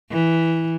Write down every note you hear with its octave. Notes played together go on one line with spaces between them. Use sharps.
E3